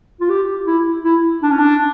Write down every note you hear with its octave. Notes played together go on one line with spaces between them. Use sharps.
F4
G4
E4
E4
D4
C#4
D4